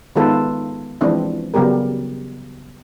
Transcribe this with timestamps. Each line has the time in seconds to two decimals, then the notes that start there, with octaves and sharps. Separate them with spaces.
0.16 D#3 G#3 B3 F4 A4 B4
1.01 E3 F3 G#3 C4 D4 E4
1.54 C#3 F#3 G3 B3 G4 A#4